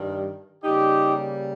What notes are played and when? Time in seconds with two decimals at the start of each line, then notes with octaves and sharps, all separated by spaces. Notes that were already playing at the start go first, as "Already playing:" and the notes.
Already playing: G2 D#3 G3
0.64 C#3 G3 A#3 D#4 G4